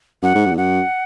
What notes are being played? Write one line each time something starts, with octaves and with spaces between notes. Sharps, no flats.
F#2 F#5
G#2
F#2
E2
F#2 F#5